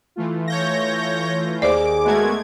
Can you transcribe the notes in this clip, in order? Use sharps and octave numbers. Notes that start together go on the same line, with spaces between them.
E3 A3 F4
C#5 G6 A#6
D#2 G#4 C5 D5 D6
G#3 A3 B3 F#4 A#4 G#6